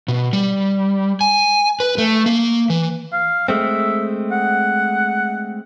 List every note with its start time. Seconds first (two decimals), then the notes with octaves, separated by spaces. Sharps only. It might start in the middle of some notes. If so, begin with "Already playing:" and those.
0.08 B2
0.33 G3
1.21 G#5
1.80 B4
1.98 A3
2.26 A#3
2.70 E3
3.13 F5
3.48 G#3 A3 C4 E5
4.31 F#5